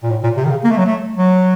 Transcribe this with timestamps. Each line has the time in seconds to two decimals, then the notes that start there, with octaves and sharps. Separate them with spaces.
0.03 A#2
0.10 A2
0.23 A#2
0.37 C3
0.45 D#3
0.50 C#3
0.64 A#3
0.71 A3
0.78 F#3
0.86 A3
1.17 F#3